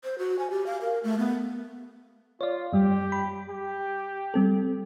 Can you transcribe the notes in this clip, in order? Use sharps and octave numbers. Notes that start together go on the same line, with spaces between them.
C5
F#4
G#5
G4
F5
A#4
A3
B3
F4 C#5 D5
F#2 G3 G4
B5
G4
G3 C4 A4